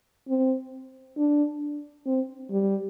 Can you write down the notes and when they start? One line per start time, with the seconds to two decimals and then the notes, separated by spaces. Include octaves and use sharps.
0.28 C4
1.17 D4
2.06 C4
2.51 G3